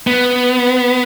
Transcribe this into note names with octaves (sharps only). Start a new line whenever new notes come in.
B3